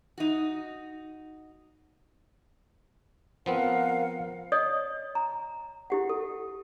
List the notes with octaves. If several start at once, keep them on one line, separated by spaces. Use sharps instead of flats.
D#4 F#4
F3 B3 C4 A#4 F5 F#5
C#5 D#5 D#6
A#5
E4 G4 F#5
A4